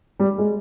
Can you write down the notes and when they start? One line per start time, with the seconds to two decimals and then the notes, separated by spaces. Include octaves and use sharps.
0.20 G3
0.38 G#3